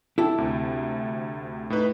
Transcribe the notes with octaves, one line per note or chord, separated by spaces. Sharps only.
E4 G4 A4
D2 C3
A2 D#4 B4